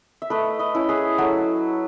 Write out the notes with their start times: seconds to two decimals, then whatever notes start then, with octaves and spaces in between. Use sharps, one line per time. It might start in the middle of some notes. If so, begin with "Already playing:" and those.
0.22 E5
0.30 A3 B4 D#5
0.59 B4 D#5
0.75 C#4 E4
0.89 G#4 B4
1.18 F#3 F#4 A4